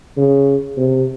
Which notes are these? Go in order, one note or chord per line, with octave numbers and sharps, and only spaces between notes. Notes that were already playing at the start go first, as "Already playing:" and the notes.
C#3
C3